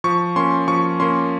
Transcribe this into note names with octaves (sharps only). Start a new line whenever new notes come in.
F3 C#6
A#3 C#4 C6
F3 C#6
A#3 C#4 C6